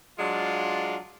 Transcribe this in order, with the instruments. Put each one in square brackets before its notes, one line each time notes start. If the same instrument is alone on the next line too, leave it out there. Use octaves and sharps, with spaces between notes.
[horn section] F#3 G#3 D4 F4